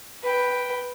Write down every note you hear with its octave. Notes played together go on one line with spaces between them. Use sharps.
B4 G5